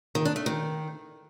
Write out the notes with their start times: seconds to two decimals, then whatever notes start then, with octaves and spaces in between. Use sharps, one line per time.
0.15 D#3
0.25 D4
0.36 A3
0.46 D#3